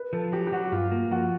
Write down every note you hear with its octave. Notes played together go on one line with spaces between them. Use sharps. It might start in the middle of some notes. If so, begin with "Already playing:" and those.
Already playing: B4
F3 A4
F#3 G4
G4
F#3 F#4
G2 F4
A#3
F3 F#4